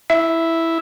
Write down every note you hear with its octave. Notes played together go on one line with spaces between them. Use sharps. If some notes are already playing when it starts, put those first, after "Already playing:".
E4 E5